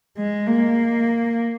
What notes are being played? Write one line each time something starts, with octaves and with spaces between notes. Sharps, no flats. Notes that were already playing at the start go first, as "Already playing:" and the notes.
G#3
A#3